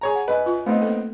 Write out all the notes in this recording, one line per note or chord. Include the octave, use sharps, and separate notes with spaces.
G#4 C#5 A#5
F#5
F#2 B4 D#5
F4
A3 B3 C4 D#4
A#3 A4